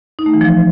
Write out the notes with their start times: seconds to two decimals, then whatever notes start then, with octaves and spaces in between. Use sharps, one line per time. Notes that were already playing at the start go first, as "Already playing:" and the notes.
0.19 D#4
0.26 A3
0.34 E3
0.41 F3